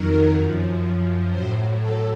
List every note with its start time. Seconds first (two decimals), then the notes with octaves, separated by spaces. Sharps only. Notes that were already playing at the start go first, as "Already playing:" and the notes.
Already playing: F2 D#3 F#3 A#4
0.35 F#2 F3
1.30 A2 F#3 C5
1.78 A4